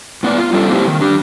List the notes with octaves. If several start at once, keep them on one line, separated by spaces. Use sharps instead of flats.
A2 B3 B4 D5
F4
G3 C#4 D4 A4
A#3 C4 E4 G4
D#3
D4 G4